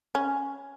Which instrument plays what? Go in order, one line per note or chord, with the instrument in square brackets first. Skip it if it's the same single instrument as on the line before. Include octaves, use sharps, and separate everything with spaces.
[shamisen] C#4